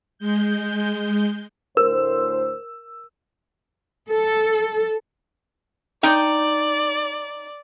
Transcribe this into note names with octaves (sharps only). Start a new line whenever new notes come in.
G#3 G6
D2 A2 A#4 C5 E6
A4
D#4 D5 G5